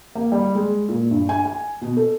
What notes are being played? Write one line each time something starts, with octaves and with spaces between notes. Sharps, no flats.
A#3
G3
G#3
A#2
G2
G#5
G#5
B2
A4